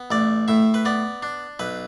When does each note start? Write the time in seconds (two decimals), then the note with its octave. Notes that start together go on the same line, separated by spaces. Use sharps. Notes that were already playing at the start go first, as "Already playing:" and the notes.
Already playing: B3
0.11 A1 D5
0.48 A2 E5
0.74 B4
0.85 B3 D5
1.23 D4
1.59 B1 B4